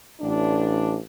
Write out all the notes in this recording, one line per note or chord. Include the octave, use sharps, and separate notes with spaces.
A1 D4